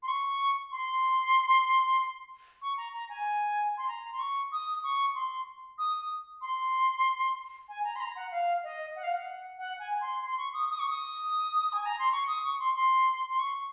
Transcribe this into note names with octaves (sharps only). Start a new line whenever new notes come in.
C6
C#6
C6
C#6
A#5
A#5
G#5
C6
A#5
C6
C#6
D#6
C#6
C6
D#6
C6
G#5
A#5
C6
A#5
F#5
F5
D#5
F#5
F5
F#5
F#5
G#5
C6
C6
C#6
D#6
D#6
C#6
D#6
G#5
A#5
C6
C#6
D#6
C#6
C6
C6
C6
C#6